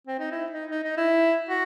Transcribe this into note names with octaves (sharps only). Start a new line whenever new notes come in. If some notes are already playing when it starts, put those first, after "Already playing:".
C4
D#4
E4
D#4
D#4
D#4
E4
F#4